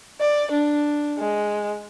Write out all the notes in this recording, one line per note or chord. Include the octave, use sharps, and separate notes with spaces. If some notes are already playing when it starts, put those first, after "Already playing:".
D5
D4
G#3